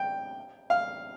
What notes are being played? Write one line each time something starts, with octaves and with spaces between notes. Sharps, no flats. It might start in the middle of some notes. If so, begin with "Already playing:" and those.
Already playing: G5
F5